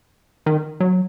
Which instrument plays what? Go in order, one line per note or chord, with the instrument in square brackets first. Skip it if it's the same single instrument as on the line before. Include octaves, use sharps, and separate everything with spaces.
[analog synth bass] D#3
F#3